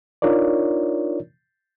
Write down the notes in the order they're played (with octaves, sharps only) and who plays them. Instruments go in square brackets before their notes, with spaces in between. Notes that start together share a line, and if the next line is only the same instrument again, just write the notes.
[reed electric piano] D4 D#4 F4 A#4 C#5 D5